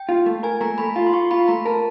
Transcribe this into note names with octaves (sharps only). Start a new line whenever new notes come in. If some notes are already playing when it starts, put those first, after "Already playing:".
Already playing: G5
F4
A3
A#4 G#5
A3 A#5
A3 B5
F4
C6
F4 C#6
F4 B5
A3 A#5
A#4 A5